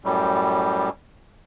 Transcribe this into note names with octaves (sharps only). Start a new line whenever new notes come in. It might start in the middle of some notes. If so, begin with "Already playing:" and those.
F#2 A2 G3